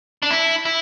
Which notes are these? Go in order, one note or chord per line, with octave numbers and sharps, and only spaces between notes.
D4
E4
E4